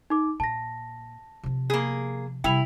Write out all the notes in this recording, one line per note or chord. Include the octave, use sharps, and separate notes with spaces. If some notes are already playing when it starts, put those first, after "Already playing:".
D#4 D6
A#2 A5 A#6
C3 F3
A#3 G#4
C3 G3 E4 G5 F7